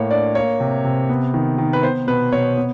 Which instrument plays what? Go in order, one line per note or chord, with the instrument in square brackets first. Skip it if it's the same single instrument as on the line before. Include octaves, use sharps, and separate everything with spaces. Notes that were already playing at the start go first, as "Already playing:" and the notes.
Already playing: [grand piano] A2 A#3 C#5
D4 D5
A#3 C#5
C3
C3
B3
D#3
D#3
B4
B3 C5
B2 B4
B2 C#5
B3